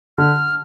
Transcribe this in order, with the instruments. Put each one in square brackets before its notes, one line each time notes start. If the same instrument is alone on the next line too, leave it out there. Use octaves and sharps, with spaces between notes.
[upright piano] D3 [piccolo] F6